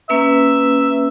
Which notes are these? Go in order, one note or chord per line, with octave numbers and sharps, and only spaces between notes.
A#3 C#4 B4 E5